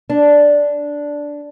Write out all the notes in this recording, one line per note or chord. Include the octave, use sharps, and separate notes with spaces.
D4